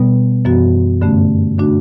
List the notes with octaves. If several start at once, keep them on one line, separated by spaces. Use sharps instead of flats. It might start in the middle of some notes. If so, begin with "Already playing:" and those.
Already playing: B2 G3 B3
F#2 E3 B3 F#4
G2 D3 A3 C#4
D3 A3 D4 F#4